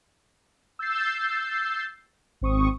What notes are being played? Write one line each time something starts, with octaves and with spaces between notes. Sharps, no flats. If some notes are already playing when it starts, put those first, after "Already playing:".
E6 G6 A6 C7
G#1 C4 C#6 D#6